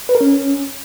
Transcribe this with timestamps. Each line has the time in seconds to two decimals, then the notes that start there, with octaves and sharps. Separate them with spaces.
0.09 B4
0.15 A#4
0.21 C#4